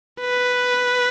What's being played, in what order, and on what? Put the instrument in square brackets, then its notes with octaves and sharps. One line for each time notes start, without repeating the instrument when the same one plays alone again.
[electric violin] B4